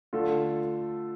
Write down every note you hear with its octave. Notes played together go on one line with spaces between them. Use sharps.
D3 A3 F4 A4